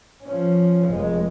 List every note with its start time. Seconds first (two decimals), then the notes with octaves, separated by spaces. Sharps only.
0.24 F3 C#4
0.89 F1 G#3